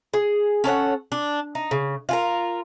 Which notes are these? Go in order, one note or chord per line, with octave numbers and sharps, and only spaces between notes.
G#4
C#4 A4 C#5 F#5
D4
D#4
C#3
F4 G#4 A#4